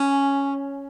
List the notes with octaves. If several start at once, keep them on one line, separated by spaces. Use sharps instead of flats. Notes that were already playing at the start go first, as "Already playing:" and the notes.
Already playing: C#4